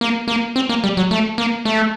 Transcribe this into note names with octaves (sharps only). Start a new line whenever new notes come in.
A#3
A#3
C4
A#3
G3
F#3
A3
A#3
A3